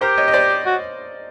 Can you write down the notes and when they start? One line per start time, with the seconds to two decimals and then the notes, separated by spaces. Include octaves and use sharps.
0.01 G4 A#4 C5
0.18 C#5 D#5
0.28 D#5
0.33 C5 D5
0.66 F#4